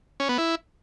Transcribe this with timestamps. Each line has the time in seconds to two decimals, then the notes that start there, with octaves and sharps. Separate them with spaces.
0.20 C#4
0.29 B3
0.38 E4